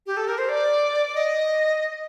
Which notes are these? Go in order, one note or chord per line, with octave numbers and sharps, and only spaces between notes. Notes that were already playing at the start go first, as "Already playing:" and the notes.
G4
A4
A#4
C5
D5
D#5